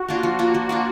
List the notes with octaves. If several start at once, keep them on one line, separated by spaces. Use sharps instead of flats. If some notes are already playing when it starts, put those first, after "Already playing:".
Already playing: F#4
A#3 D4 F4
F3
A#3 D4 F4
F3
A#3 D4 F4